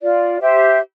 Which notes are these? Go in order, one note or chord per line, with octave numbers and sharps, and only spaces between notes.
F4 D5
G4 C5 E5